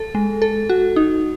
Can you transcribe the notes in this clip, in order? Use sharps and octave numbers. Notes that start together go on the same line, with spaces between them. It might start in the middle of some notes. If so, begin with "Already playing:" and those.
Already playing: A4
G#3
A4
F#4
D#4